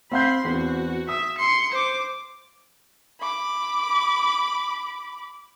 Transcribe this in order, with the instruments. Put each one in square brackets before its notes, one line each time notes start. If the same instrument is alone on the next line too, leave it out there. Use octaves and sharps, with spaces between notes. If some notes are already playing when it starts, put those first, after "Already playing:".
[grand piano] C4 F5 G6 [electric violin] B5 C6
[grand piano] E2 C4 [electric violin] F#4
[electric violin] E5 [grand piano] D#6
[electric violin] C6 C#7
C5 D6
[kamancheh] B5 D6